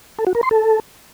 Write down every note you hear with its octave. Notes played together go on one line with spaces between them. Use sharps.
A4
F#4
A#4
C6
A4